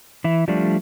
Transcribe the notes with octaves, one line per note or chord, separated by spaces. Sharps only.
E3 E4
F3 G3 A3 D4